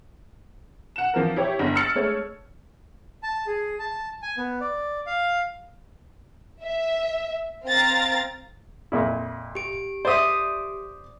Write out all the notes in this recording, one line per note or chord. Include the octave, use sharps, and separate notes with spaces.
F#5 E7
E3 F3 C4 A#4
E4 G4 C#5
G1
E6 F6 A6 C#7 F#7
G#3 A3 C#5
A5
G#4
A5
G#5
B3
D5
F5
E5
C4 F5 A#5 A6
F2 A#2 E4
G4 D7
C5 D5 E5 D#6